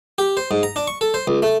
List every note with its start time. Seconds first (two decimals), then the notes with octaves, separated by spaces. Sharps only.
0.18 G4
0.37 C5
0.51 G#2
0.63 A#5
0.76 D4
0.87 C#6
1.01 A4
1.14 C5
1.27 C#2
1.42 A3